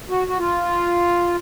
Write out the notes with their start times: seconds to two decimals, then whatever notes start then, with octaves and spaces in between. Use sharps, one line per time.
0.10 F#4
0.28 F#4
0.38 F4